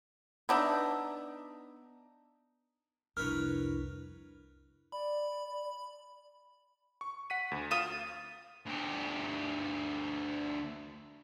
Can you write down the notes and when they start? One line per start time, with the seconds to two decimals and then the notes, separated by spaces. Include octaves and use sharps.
0.49 B3 D4 D#4 E5
3.17 C2 F2 D4 E4 A#4 B4 C#5 F6
4.92 D5 B5
7.01 C#6
7.30 F#5 B6 D#7
7.51 D2
7.71 F4 D#6 E7
8.66 D2 G4